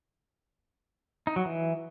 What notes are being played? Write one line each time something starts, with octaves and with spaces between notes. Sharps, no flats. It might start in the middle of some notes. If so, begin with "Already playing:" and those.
D#4
F#3
E3